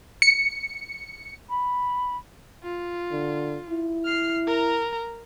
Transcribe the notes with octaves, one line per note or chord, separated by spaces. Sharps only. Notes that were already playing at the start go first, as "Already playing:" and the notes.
C#7
B5
F4
D3
E4
F6 C7
A#4 A#5